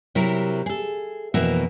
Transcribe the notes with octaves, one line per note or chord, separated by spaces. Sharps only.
C3 F#3 E4 A#4
G#4 A4
F2 B2 E3 A#3 F#4 E5